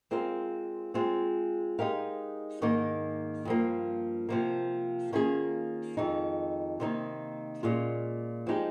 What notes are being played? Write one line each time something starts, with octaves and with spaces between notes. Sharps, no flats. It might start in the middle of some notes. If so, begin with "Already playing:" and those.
G#3 C4 F4 A#4 F5
G#3 C4 F4
G#3 D#4 G4 A#4 F5
G#2 D#3 A#3 D#4
G2 F3 A#3
C3 F3 A#3
D#3 A#3 C#4 F4 G#4
F2 D#3 G#3 D#4
C3 D#3 A#3 D#4
A#2 G#3 C#4 F4
F3 G#3 D#4 G4